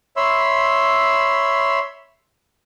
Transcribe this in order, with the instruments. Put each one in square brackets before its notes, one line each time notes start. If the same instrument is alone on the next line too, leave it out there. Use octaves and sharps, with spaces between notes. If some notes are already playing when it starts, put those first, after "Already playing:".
[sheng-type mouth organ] C#5 E5 B5 C6 E6